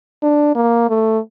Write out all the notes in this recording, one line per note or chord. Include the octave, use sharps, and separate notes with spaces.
D4
A#3
A3